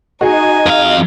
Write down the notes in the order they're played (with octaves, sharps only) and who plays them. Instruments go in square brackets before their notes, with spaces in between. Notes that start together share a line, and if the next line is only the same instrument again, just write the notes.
[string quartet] D#4 G#5 [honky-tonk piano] F#4 G#4 [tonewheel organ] D#5
[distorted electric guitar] F2 F5